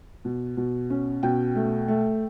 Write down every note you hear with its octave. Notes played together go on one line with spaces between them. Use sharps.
B2
B2
C#4
B2 G5
A3
A3